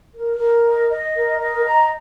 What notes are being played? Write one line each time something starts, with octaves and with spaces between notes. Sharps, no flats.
A#4
A#4
D#5
D#5
A#4
D#5
A#5